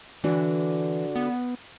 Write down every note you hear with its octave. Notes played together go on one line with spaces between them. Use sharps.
D3 E3 D4 F#4
B3